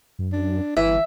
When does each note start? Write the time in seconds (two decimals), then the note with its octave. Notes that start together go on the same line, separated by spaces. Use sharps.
0.19 F#2
0.32 D4
0.77 G1 E3 E5